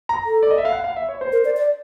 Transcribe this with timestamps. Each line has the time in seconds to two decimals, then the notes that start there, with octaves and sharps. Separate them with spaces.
0.09 A#5
0.26 A4
0.43 D5
0.50 D#5
0.58 E5
0.65 F5
0.72 F#5
0.84 F5
0.96 E5
1.09 C#5
1.21 C5
1.32 A#4
1.45 D5
1.57 D5